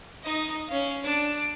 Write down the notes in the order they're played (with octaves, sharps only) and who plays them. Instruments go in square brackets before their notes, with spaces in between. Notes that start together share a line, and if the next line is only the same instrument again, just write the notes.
[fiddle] D#4 D#5
C#4 F5
D4